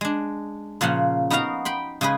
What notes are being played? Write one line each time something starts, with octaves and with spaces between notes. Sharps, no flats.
G#3 D4
A#2 C#3 F3 F4 F#5
B3 D#4 F#4 A#4 F5 A#5
G5 B5 C6
C#3 G#3 G#4 B4